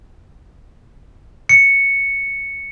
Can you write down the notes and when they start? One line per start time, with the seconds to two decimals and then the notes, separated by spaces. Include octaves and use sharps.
1.49 C#7